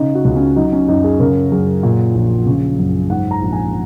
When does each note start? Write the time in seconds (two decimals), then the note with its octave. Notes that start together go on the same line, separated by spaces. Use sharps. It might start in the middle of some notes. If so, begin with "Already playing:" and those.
Already playing: C#3 D#4
0.15 F#4
0.25 C#2
0.36 C#4
0.56 F#3 D#4
0.72 C#4
0.88 F#2 D#4
1.04 G#4
1.20 C#3 A#4
1.52 F#2 G#4
1.83 A#2
2.15 A#1
2.46 C#3
2.78 F#2
3.10 G#2 F#5
3.31 A#5
3.42 A#1
3.53 G#5